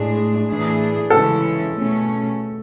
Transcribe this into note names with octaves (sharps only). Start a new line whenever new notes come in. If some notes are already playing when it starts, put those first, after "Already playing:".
Already playing: A2 G#3 D4 G#4
A2 E3 A3 D4 G#4
C#3 E3 G#3 C#4 A4
B2 A3 C#4